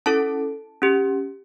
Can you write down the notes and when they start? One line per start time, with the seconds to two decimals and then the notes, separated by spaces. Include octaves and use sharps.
0.06 C#4 E4 A4 A5
0.82 C#4 G4